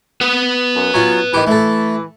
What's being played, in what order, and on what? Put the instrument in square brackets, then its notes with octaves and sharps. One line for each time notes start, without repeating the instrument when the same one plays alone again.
[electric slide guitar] B4 F#5
[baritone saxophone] F#2
[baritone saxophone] F#3 [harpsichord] C#4 F4
[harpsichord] D#3 G4 [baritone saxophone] E3
[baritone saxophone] E3 [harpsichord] A3 A4